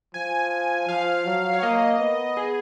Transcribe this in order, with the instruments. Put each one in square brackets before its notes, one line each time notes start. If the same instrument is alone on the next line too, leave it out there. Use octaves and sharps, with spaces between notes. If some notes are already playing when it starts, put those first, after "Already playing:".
[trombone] F3 [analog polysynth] G#5
[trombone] F3 [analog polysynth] F5
[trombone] F#3
[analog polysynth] C#5
[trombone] A#3 [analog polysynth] D#5
[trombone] B3
[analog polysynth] G#4